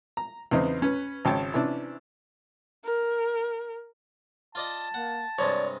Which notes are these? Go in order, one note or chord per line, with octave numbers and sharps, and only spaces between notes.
A#5
E2 C#3 B3 C4 D#4
C#4 B4
G#1 C#3 C#5 G5 A5
C3 E3 C#4 D4
A#4
F4 D5 D#5 A5
A#3 F#5
G2 C3 G#3 C#5 D5